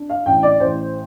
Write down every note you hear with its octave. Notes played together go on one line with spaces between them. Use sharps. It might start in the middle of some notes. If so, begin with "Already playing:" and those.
Already playing: D4
F5
A1 G5
D5
A1 C5